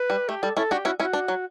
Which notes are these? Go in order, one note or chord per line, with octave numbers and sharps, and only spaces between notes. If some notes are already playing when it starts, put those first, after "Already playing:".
Already playing: B4
G3
A3 G4
G3 A4
C#4 E4 A4
D4 F#4 G4
C#4 E4 F#4
C#4 E4 F#4
D4
F#3